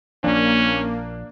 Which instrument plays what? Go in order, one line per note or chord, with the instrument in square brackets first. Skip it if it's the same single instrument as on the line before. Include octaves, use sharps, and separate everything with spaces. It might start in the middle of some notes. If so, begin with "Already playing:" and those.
[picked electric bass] A#1 F3 [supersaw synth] A#3 [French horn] C#4 [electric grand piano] D4